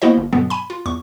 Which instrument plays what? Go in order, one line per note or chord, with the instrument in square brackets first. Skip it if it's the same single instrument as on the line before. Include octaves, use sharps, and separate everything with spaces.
[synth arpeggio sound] A#3 B3 E4 F#4 C5 D#5
G1
G2 B2 D3 F#3 B3
G#5 B5
F4
E2 C#6